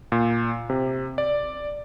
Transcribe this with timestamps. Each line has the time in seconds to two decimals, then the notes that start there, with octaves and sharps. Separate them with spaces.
0.12 A#2
0.70 C3
1.18 D5